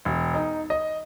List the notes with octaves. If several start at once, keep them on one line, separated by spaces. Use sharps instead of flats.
E1
D#4
D#5